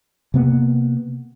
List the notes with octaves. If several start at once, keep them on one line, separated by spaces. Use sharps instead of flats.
C3 A#3 B3